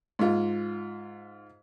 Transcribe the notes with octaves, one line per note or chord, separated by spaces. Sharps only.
G#2 F4